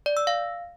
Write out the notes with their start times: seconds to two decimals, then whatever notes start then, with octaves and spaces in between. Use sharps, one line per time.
0.06 D5
0.17 E6
0.27 F5